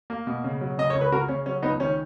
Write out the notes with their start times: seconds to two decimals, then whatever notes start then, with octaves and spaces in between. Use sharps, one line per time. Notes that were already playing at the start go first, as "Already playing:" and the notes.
0.10 A#3
0.27 B2
0.44 C#3
0.61 F#3
0.77 C#3 D#5
0.90 C#2 C#5
1.01 B4
1.12 C#3 F#4 A#4
1.29 C#3 C#4
1.46 F#3 C#4
1.62 C#2 B3 D#4
1.80 D#3 C#4